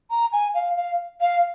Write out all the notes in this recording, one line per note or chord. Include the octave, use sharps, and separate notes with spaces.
A#5
G#5
F5
F5
F5